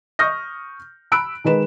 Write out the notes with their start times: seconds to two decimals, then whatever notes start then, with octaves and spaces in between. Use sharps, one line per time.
0.19 C#6 D#6 F6 G6 A#6
1.12 B5 E6 F#6 D7
1.44 D#3 G#3 B4 E7